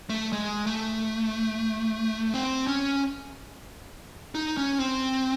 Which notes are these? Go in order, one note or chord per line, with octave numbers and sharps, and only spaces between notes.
A3
G#3
A3
C4
C#4
D#4
C#4
C4